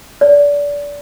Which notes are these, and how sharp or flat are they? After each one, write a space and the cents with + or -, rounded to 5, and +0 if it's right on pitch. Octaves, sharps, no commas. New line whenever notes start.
D5 -25